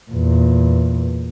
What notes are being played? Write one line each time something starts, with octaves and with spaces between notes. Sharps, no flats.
E2 A#2